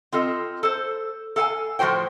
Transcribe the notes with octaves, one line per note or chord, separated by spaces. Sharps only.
C4 F4 A4 D#5
A4 C5
A4 F5 G5 G#5
A2 F3 G3 F#4 C5 G5